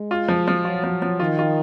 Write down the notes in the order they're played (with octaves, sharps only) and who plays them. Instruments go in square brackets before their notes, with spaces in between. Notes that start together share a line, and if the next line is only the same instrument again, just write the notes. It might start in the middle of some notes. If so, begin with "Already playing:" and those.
Already playing: [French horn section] G#3
[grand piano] F4
F3
F3
[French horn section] F#3 [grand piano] F4
[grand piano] F3
F3
[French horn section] D#3 [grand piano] F4
[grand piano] F4